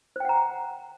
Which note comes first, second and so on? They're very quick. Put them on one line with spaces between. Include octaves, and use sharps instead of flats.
C5 G5 F#5 A#5